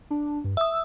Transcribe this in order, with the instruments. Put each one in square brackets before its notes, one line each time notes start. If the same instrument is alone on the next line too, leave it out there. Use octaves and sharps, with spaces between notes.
[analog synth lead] D4
G2
[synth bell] E5 D#6 [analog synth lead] E6